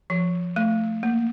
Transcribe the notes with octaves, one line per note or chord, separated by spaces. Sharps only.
F3
A3
A#3